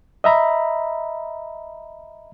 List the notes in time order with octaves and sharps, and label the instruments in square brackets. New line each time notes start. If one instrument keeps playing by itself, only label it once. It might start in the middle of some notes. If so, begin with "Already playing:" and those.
[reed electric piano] D#5 E5 A#5 B5